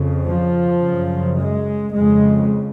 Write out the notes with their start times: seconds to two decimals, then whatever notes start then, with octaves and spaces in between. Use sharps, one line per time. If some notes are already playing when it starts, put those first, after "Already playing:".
Already playing: F2 C#3
0.26 F3
0.82 F#2 C#3
1.38 G#3
1.94 F2 C#3 G#3